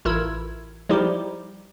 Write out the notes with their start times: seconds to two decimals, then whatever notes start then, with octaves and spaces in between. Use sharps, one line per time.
0.05 A1 E4 F4 A#4 E6 G#6
0.89 F3 G3 D#4 E4 G4